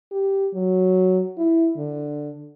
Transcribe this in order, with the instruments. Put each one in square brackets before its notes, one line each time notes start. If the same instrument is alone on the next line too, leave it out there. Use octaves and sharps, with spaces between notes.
[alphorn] G4
F#3
E4
D3